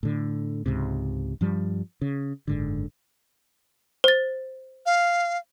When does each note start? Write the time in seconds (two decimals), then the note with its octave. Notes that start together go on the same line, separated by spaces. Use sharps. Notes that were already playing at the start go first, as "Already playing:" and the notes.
0.03 A2 D3
0.66 C#2 G#2 C3
1.41 G2 F3 G3
2.02 C#3
2.48 F#1 G#2 D3
4.04 C5 A6
4.86 F5